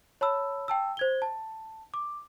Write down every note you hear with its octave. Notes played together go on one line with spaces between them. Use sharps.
C#5 A5 B5 E6
G5 A5 E6
C5 G#6 G7
A5
D6